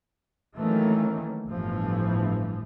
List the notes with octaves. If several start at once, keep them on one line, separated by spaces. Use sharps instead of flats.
D#3 E3 F#3 A3 A#3 C#4
G1 A2 E3 F3